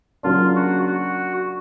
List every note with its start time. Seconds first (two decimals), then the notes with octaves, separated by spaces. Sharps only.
0.23 C#3 F#3 A#3 D4 F4
0.56 F#4
0.88 F#4